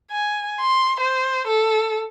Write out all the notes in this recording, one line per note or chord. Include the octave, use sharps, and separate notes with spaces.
G#5
C6
C5
A4